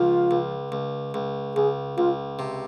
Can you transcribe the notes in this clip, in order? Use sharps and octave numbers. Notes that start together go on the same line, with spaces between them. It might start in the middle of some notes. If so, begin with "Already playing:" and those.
Already playing: C#2 F3 F4
C#2
C#2
C#2
C#2 G#4
C#2 F4
C3